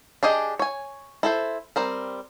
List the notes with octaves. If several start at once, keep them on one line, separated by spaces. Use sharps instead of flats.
D4 G4 G#4 D#5
C#5 G#5
E4 A4 C5
G3 C4 A#4